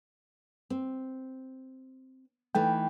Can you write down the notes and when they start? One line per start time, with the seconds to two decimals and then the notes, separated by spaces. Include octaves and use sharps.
0.70 C4
2.55 E3 A3 D#4 G5